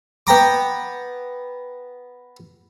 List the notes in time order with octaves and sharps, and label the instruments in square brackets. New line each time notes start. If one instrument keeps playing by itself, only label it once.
[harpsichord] B3 G5 A#5 D6